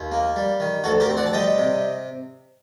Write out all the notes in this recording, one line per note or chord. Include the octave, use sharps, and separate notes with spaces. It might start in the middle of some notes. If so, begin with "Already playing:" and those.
Already playing: D#2
A#3
G3
D#3
D2 F#4 A4
G4 A#4
C4
D5 F#5
A5
G3 D#5 G5
C3